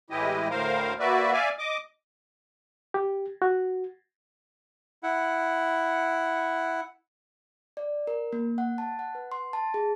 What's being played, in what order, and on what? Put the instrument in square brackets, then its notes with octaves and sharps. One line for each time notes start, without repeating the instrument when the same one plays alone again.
[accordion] A2 E3 G#3 E4 G4 D#5
D2 A2 A#4 C5 F5
A#3 F#4 B4 D5 E5
D5 E5 F5 G#5
D#5 D6
[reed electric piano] G4
F#4
[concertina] E4 F#5
[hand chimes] D5
A#4
A#3
F#5
A5
F#5
B4
C6
A5
G#4